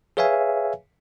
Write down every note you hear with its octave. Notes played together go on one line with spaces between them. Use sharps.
G#4 B4 C#5 E5 F5 G#5